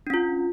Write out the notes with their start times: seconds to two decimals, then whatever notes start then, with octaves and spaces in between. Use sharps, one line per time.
0.07 D4
0.10 C#4
0.14 F4